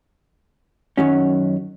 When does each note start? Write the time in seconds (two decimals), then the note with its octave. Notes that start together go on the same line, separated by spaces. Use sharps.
0.97 F#2 D#3 F#3 C#4